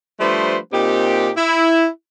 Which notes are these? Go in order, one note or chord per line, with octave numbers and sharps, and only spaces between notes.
F3 G3 A3 D4 B4 C5
A#2 C4 D#4 G4
E4